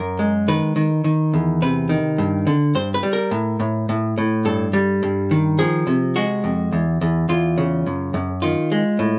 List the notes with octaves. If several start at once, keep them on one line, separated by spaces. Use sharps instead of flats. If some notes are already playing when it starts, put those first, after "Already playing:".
Already playing: F#2 A#4
G#3
D#3 B4
D#3
D#3
E2
C3 B4
D#3
G2
D3
G2 C5
B4
G3
A#4
A2
A2
A2
A2
G2 A4
G3
G2
D#3
F3 G#4
C3
G#3 F#4
F2
E2
E2
E2 F4
C#3
F#2
F#2
D#3 F4
G#3
A2